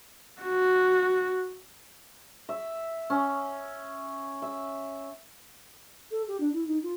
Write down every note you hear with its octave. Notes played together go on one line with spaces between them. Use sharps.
F#4
E5
C#4
E5
A4
G4
D4
E4
D#4
F4